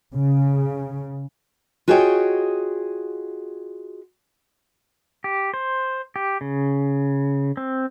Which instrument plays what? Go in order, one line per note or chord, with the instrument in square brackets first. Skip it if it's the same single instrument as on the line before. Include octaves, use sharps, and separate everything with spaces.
[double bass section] C#3
[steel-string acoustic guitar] F4 F#4 G#4 C#5 D#5 G5
[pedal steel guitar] G4
C5
G4
C#3
C4